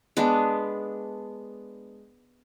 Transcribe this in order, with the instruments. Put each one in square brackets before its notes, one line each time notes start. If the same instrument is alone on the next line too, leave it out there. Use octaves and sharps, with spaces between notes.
[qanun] G#3 B3 D4